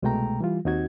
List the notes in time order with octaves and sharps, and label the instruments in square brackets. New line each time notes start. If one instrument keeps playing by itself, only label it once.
[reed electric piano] C2 B2 G#3 A3 G5 A#5
E3 G3 F4
D#2 C4 D#4 F#4 G#6